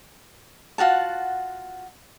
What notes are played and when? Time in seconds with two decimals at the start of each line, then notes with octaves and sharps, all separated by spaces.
0.78 F4 F#4 F#5 A5